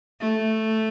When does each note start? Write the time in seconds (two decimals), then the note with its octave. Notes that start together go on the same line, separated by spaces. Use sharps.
0.21 A3